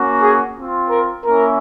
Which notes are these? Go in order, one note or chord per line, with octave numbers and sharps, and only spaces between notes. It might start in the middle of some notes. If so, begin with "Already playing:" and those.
Already playing: A#3 C#4 F#4
G#4
C4 F4
A#4
A#3 C#4 E4 A#4